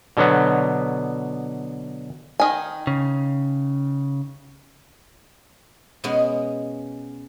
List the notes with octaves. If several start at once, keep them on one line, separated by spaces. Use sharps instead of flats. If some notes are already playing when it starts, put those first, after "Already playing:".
B2 D3 F#3 B3
D#3 G#5
C#3
B2 G#3 B3 C#4